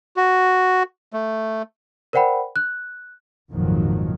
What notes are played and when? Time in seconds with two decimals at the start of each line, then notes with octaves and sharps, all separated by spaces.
0.17 F#4
1.13 A3
2.13 A#4 C5 D5 F#5 G5 B5
2.56 F#6
3.50 G#1 F2 A#2 D#3 F3 F#3